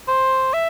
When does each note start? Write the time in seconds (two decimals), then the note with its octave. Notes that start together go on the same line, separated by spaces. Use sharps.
0.08 C5
0.53 E5